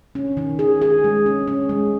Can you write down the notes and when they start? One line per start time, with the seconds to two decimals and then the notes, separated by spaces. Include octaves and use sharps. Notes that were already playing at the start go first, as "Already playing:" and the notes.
0.15 C#4
0.37 D#3
0.59 G#4
0.82 G#4
1.04 G#3
1.26 C#4
1.48 C#4
1.69 G#3